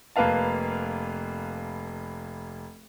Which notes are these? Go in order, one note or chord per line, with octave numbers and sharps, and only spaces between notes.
F1 A#3 B4 F5 A5